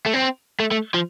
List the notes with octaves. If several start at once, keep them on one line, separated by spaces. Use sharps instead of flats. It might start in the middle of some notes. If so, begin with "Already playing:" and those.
A3
C4
A3
A3
F3